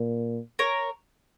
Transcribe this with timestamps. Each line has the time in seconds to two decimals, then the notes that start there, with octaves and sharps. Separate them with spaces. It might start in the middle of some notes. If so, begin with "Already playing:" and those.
Already playing: A#2
0.59 A#4 C#5